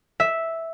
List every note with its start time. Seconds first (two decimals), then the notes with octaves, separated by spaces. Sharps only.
0.20 E5